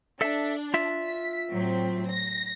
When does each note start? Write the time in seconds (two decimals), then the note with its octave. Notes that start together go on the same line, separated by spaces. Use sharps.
0.21 D4 A4 E5
0.74 F4 E5
1.07 B6
1.52 A2 F#3 C4
2.08 A#6